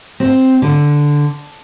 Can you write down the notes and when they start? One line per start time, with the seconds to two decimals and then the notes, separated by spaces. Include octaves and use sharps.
0.20 C4
0.62 D3